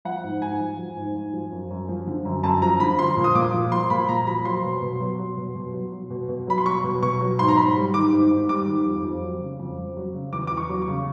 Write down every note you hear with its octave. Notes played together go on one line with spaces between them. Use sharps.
F3 F#5
G#2
G#2 G#5
F3
F3
G#2
G#2
F3
F#2
F#2
F3
D3
F#2
F#2 A5
F3 A#5
D3 B5
F3 C6
A#2
D#6
A#2 D6
F3
F3 C6
A#2 B5
A#2 A#5
F3 B5
F#3 C6
B2
B2
F#3
F#3
B2
B2
F#3
F#3
B2
B2
F#3 B5
C6
F#3 C#6
B2
B2 C#6
F#3
G#2 C6
A#5
G#2 B5
G3
D#3 D6
G#2
G#2
G3 D6
D#3
F2
F2
F#3
C#3
F2
F2
F#3
C#3
E2 D6
E2 D6
C#6
F#3
C#6
C#3